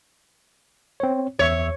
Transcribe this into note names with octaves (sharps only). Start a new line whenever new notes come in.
C4 C#5
E2 C#5 E5 E6